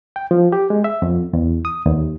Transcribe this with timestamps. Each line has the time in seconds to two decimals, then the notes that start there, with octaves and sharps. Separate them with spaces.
0.16 G5
0.31 F3
0.52 G4
0.70 G#3
0.84 E5
1.02 F2
1.33 E2
1.65 D#6
1.86 D#2